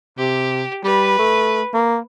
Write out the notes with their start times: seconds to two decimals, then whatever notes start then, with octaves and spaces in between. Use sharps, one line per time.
0.19 C3 G4
0.84 G3 B4
1.19 A3
1.74 A#3